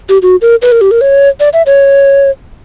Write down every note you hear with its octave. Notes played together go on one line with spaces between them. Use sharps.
G4
F#4
A#4
B4
A#4
G4
A#4
C#5
D5
E5
C#5